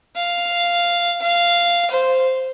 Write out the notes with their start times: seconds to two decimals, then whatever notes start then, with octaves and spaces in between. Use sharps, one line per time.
0.16 F5
1.21 F5
1.91 C5